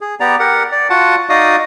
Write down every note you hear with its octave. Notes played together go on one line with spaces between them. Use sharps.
G#4
B3 G4 D5 A#5
G4 A#4 F#5
D5
F4 F#4 F#5 A5
D#4 F#4 D5 D#5 F5 D#6